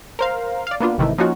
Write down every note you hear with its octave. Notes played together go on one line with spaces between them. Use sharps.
A#4 C5 F5
D5 F5
A#3 B3 D4 F4
G#1 C3 D#3 E3 A3
F3 A#3 C#4 D#4 F4 F#4